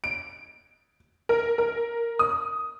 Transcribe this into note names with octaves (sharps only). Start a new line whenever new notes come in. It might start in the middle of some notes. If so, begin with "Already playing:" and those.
D7
A#4
A#4
D#6